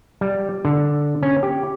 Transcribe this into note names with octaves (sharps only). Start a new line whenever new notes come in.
G3
D3
C#4
G4